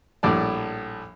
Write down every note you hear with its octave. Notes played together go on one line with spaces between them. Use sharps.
A#1 A2 G3 D5 A5